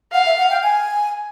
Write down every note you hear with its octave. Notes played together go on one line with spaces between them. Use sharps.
F5 F#5
E5
F#5
G5
G#5